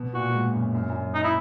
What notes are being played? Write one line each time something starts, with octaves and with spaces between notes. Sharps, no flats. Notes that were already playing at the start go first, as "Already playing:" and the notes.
Already playing: B2
A#2 F#4
A#2
G#2
F#2
F#2
F#2
D#4
E4